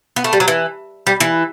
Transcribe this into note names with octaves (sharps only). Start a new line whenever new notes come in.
B3
A3
G3
F#3
E3
G3
E3